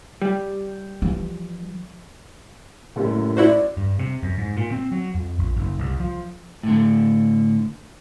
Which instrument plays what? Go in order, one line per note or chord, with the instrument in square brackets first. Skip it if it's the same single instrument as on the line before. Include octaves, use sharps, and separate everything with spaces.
[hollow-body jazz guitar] G3
[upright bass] E3 F3
[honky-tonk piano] F#1 F#2 G3 [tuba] A2
[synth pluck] E4 F#4 C5 [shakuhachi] D5
[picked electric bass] G2
C3
F#2
G#2
A#2
C4
F#3
F2
A#1
F#1
C2
F3
[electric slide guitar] A2 D3